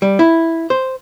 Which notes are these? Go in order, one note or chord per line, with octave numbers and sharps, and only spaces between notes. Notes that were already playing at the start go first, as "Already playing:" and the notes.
G3
E4
C5